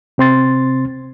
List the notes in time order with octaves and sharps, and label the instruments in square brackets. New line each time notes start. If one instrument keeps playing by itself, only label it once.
[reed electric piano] C3 C4 C6 A6